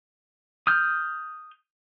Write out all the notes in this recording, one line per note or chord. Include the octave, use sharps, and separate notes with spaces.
D#6 F6 G6